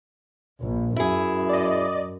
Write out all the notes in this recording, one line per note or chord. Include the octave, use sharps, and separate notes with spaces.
A#1
F#2 E4 G#4
D5 D#5